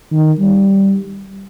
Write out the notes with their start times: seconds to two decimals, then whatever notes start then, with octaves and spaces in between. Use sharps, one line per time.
0.12 D#3
0.39 G3